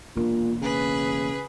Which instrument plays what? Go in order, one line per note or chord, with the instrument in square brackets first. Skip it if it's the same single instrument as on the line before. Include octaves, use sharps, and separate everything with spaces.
[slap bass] E1 A#3 D4 [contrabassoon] A#2
[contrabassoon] C#3 [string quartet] G#4 B4